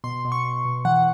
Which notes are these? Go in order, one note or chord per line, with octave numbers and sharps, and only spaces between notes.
B2 C6
B2
C#6
B2
B2
E3 F#5